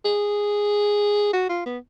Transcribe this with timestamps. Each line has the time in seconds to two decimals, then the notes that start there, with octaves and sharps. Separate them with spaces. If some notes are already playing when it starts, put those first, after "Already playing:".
0.05 G#4
1.33 F#4
1.49 F4
1.66 B3